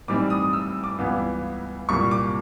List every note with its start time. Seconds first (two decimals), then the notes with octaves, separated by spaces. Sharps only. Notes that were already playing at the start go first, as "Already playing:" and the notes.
0.08 A2 E3 G3 C4 D#4 D6
0.30 D#6
0.53 E6
0.84 D6
0.98 C#2 C#3 E3 G3 B3
1.89 C2 A#2 G3 A#3 C#6
2.11 D6